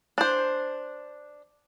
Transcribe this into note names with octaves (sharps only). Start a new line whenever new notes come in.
D4 C5